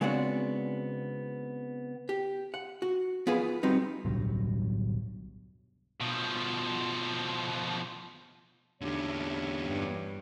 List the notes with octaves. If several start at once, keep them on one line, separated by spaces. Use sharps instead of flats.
C#3 G#3 B3 C4 D4 F#4
G4
F#5
F#4
B3 F4 G#4 B4
G3 B3 C4 D#4 F#4
D1 B1 G2 F#3
B2 F3
E2 D3 D4 G4 C#5
G2